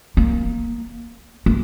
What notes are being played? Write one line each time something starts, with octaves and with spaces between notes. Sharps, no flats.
A#3
A#3